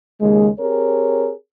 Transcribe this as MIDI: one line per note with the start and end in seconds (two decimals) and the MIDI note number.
0.21 0.48 39
0.21 0.48 49
0.21 0.48 56
0.59 1.31 60
0.59 1.31 67
0.59 1.31 68
0.59 1.31 70
0.59 1.31 73